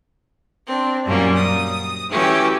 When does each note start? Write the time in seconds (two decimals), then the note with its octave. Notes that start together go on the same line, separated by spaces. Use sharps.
0.66 C4 D4
1.05 F#2 A#2 G3 A#3 C#4
1.36 D#6
2.10 E3 A3 C#4 F#4 G4